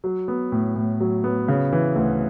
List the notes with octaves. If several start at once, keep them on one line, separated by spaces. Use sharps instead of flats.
F#3
B3
A2
A2
F#3
B3
C#3
E3
D2